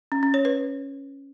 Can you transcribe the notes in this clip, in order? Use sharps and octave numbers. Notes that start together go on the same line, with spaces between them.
C#4
C#4
C#5
B4